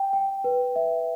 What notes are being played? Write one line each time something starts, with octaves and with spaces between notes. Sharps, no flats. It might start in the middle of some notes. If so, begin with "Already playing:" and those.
Already playing: G5
G5
B4
E5